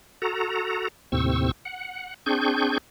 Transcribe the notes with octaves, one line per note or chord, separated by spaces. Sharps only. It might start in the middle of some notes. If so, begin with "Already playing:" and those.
F#4 A4 A#5
D#2 A2 C3 C4 C#6 E6
F#5
C4 D4 G#4 C#6 G6